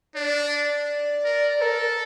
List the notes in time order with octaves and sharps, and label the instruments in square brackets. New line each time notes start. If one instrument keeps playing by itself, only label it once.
[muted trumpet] D4 [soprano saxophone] D5
[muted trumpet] A#4
[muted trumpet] A4 [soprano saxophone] A#4
[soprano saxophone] A#4